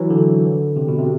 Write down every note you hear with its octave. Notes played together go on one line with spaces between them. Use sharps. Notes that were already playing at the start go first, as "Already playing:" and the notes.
Already playing: E3 F#3
D3
C3
B2
C3